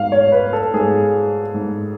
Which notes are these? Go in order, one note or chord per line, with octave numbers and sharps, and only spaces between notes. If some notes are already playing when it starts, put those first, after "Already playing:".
Already playing: G#2 F5
C#5
B4
A4
G#2 G#4
G#2